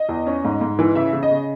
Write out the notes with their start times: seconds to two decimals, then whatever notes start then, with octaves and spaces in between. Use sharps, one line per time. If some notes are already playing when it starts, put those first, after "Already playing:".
Already playing: D#5
0.09 E2
0.27 C#4
0.45 G#2
0.61 G#2
0.79 E3
0.95 C#3 E5
1.13 C#3
1.23 D#5
1.31 C#3